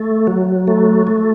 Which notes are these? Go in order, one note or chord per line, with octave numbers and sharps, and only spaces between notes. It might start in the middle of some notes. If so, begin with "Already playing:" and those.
Already playing: A3
F#3
A3
A3